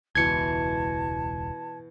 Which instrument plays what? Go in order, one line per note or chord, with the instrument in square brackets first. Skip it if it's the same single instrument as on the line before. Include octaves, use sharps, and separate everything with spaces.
[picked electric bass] E1 C#2 [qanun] B2 E3 C6 [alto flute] A5 [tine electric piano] G#6 C#7